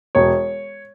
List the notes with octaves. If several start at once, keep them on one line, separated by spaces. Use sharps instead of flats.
E1 C#5